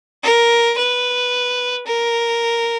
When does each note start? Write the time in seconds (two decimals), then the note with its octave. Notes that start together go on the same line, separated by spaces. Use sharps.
0.23 A#4
0.78 B4
1.86 A#4